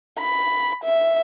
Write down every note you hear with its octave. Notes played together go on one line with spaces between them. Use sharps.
B5
E5